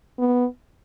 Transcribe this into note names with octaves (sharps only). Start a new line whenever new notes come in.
B3